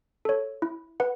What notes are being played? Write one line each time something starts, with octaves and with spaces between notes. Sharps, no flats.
A4 C#5
E4
B4 F#5